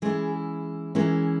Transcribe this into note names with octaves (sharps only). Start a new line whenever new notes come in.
E3 G#3 C#4 E4 G#4
E3 G#3 C#4 E4 A#4